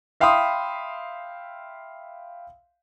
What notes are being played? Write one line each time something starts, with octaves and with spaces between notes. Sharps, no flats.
E5 F5 G5 B5 C6 D#6